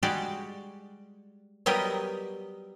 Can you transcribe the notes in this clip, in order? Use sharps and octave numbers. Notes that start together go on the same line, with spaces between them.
G3 G#3 F#4 G4 D5
F#3 G3 B3 G4 A#4 D#5